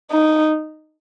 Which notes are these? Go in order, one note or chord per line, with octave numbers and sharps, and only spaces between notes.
D#4